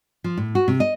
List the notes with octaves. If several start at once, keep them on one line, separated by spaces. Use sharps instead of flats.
F3
A2
F#4
C3
D#5